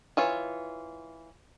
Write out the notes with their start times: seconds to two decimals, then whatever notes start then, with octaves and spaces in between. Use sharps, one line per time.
0.17 E3 F4 C#5